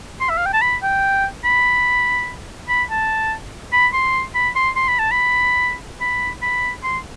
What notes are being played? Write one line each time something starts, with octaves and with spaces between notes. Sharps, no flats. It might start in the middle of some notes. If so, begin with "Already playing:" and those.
C6
E5
F5
G5
A5
B5
G5
B5
B5
A5
B5
C6
B5
C6
C6
B5
A5
B5
B5
B5
C6